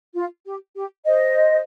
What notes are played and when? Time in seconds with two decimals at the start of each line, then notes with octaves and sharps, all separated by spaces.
0.15 F4
0.45 G4
0.75 G4
1.06 C5 D#5